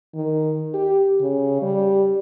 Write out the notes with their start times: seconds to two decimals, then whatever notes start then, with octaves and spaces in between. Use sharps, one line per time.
0.14 D#3
0.74 G4
1.21 C#3
1.62 G3